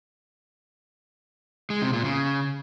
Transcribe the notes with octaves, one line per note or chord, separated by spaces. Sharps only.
G#3
C3
A#2
C#3